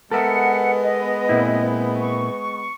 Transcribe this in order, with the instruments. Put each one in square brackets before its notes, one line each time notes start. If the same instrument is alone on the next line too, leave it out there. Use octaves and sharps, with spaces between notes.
[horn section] G#3 B3 [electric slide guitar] A4 A#4 E5 [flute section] F#5
[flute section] D#5
[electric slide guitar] A#2 C4 E4
[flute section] C#6